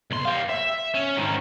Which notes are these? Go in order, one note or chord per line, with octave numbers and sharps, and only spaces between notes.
B1 C6
G4 F5
E5
C#4
G#2 D#3